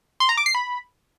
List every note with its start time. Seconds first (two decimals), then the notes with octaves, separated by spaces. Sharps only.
0.20 C6
0.29 A#5
0.37 D6
0.46 C7
0.55 B5